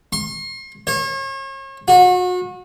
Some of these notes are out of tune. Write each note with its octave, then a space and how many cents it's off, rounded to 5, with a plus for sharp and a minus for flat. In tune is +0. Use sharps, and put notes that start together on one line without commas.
C6 +40
C#5 -40
F#4 -35